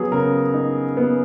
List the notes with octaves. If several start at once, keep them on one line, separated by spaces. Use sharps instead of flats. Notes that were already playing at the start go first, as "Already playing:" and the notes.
Already playing: F#3 B3 G#4
C#3 A#4
D#4
B3